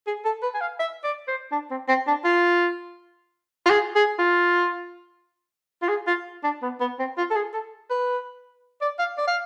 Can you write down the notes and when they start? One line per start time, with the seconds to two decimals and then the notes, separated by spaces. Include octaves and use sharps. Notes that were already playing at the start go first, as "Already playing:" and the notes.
0.07 G#4
0.25 A4
0.43 B4
0.54 G#5
0.61 F5
0.80 E5
1.04 D5
1.28 C5
1.52 D4
1.71 C4
1.88 C4
2.07 D4
2.25 F4
3.66 F4
3.70 G#4
3.95 G#4
4.19 F4
5.82 F4
5.89 G#4
6.07 F4
6.44 D4
6.62 B3
6.80 B3
6.99 C4
7.18 F4
7.30 A4
7.35 G#4
7.54 A4
7.90 B4
8.81 D5
8.99 F5
9.18 D5
9.27 F5